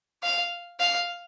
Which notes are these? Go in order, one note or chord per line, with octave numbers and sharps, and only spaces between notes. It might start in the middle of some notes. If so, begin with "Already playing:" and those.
F5
F5